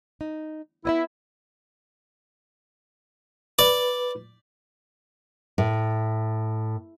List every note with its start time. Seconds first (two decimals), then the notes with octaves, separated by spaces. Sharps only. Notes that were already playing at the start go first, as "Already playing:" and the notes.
0.21 D#4
0.85 B3 E4 D#5 E5
3.59 B4 D5
5.58 A2